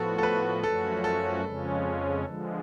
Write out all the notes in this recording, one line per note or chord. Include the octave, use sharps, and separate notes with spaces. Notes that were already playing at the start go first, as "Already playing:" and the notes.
Already playing: A2 F3 B3 F#4 A4
A4
B4
F#2 F3 A3 C#4 F#4 A4
A4
F2 C#3 F3 G#3 C#4
D3 F3 G#3